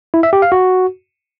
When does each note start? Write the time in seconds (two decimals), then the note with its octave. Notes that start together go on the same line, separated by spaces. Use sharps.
0.14 E4
0.23 E5
0.33 G4
0.42 F5
0.52 F#4